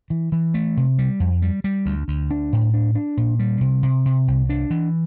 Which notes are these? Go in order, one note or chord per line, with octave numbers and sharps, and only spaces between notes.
E3
E3
A3
C3
G3
F2
G3
G3
D2
D2
D4
A2
D4
D4
A#2
G3
C3
C3
C3
C2
D4
E3